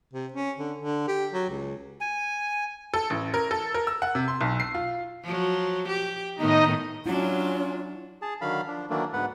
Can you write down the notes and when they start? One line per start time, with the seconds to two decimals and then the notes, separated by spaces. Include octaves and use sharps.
0.13 C3
0.32 C#4
0.58 D3
0.78 D3
1.08 G4
1.33 F#3
1.50 C#2
2.01 G#5
2.94 A4
3.10 A1
3.34 A#4
3.51 A4
3.74 A#4
3.87 E6
4.02 F#5
4.15 C3
4.28 C6
4.41 B1
4.60 C7
4.74 F4
5.24 F3 F#3
5.88 G4
6.39 A2 D#3 B3 D#4 D#5
7.06 F#3 C#4 D4 E4 F4
8.22 G#4 A5
8.41 D3 D#3 F#3 F5 B5
8.67 F3 D4
8.90 D#3 E3 F#3 A3 A#3 D4
9.13 D2 G#2 B3 B4 F#5